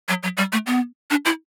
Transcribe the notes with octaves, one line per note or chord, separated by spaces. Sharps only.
F#3
F#3
G3
A3
B3
D4
E4